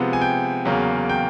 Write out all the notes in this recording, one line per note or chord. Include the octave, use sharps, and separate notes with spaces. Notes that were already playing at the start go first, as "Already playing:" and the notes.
Already playing: C3 F3 G#3 B3
G#5
G5
E2 C#3 F#3 A#3
G5